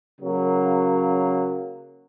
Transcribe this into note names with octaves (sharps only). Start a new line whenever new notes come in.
C#3 F#3 A#3